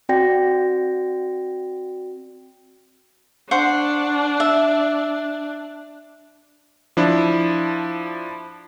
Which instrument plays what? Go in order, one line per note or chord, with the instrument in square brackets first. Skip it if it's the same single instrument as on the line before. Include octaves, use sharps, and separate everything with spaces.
[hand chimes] C4 F#4 D5 G5 A#6
[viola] D4 [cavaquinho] C5 F#5 C#6
[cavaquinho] E5
[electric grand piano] F3 D4 E4